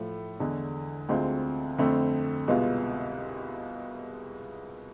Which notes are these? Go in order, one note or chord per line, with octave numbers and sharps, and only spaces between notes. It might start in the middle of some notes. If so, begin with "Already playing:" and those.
Already playing: A2 F3 A3
E2 D3 G#3 D4
D2 D3 G#3 C4 F4
F2 D3 A3 C4
C2 B2 G#3 B3 F4